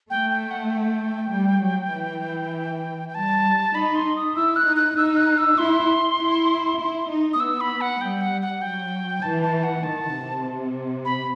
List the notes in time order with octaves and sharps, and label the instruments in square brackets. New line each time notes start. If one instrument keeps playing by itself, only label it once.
[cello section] A3 [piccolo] G5
[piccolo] G5
F#5
G5
[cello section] G3
F#3
E3
[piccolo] G5
[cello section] G3 [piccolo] A5
[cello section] D#4 [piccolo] B5
[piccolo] C6
D#6
[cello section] E4 [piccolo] E6
[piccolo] F#6
[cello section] D#4
[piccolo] F#6
[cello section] D#4 [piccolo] E6
[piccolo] F#6
E6
[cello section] E4 [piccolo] C6
[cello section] E4
E4
D#4
[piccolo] D#6
[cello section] B3 [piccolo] E6
[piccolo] B5
F#5
[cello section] G3 [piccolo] G5
[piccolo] F#5
F#5
[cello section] F#3 [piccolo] G5
[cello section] E3 [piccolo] A5
[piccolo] A5
F#5
[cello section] D#3 [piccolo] A5
[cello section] C3
[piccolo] B5